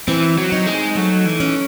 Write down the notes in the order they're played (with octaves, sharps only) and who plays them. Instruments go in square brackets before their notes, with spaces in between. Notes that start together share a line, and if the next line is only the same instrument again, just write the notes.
[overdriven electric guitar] E3 [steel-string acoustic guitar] C4
[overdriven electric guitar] F#3
[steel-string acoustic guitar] D#4
[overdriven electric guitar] G#3
[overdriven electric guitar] F#3 [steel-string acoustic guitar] A3
[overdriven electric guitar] E3
[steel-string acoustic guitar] C#4